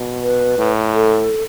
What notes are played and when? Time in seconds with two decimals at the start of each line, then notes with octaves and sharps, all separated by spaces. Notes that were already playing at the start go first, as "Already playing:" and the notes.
Already playing: B2
0.23 B4
0.58 A2
0.94 A4